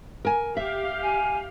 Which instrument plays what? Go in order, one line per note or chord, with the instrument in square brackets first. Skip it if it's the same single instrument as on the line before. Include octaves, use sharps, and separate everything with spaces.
[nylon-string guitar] A#4 G#5
[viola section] G4 F5 [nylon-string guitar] E5
[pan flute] G#5